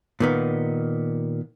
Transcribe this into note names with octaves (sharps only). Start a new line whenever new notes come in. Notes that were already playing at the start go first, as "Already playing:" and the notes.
A#2 D#3 B3